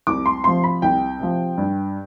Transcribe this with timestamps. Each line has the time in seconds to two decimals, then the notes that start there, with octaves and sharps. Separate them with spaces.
0.07 C2 D6
0.26 C6
0.44 C3 F3 C6
0.64 B5
0.82 C2 G5
1.20 C3 F3
1.58 G2